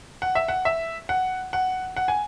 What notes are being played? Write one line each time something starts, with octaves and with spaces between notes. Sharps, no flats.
F#5
E5
F#5
E5
F#5
F#5
F#5
G#5